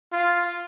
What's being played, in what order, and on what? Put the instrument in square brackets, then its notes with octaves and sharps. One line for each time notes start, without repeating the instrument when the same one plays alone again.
[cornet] F4